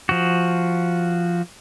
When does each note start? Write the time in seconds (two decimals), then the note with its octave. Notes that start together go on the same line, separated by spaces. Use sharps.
0.09 F3 F#4